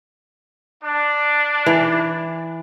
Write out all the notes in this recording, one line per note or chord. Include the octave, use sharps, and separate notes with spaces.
D4
E3